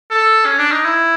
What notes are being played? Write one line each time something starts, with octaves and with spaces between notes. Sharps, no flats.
A4
C#4
D4
D#4
E4